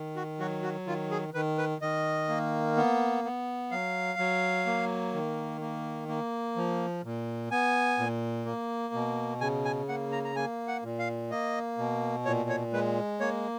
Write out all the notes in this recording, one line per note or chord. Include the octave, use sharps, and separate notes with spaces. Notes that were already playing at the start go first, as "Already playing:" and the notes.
Already playing: D#3
F#4
F#3 F#4
F#4
D#3 F4
G#4
D#3 B4
B4
D#3 D#5
A#3
B3
B3
F#3 F5
F#3
A#3
D#3
A#3
A#3
F3
A#2
B3 G#5
A#2
A#3
B2
C#3 G#5
G#5
A#3 F#5
A#5
A#5
A#3 G#5
F#5
A#2
F5
A#3 D#5
B2
A#2 C#5
C#5
G#3 B4
A#3 C#5